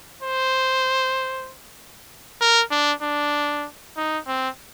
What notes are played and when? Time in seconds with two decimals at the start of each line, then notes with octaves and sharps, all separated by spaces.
0.23 C5
2.41 A#4
2.71 D4
3.02 D4
3.97 D#4
4.27 C4